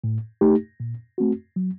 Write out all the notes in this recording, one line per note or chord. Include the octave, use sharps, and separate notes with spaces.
A2
A3 D#4 G4
A#2
A3 C4 F#4
F#3